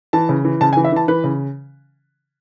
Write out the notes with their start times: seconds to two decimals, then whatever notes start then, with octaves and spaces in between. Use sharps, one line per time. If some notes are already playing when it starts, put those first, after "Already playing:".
0.13 E3 A5
0.29 C#3
0.45 E3
0.61 C#3 A5
0.73 G#5
0.77 E3
0.84 E5
0.92 E3 A5
1.08 E3 B4
1.24 C#3